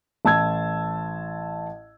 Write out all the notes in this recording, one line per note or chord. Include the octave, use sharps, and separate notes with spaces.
A1 A5 E6 G#6